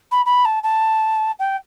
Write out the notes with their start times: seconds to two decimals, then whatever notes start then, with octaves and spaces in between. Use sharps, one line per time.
0.12 B5
0.26 B5
0.45 A5
0.63 A5
1.40 G5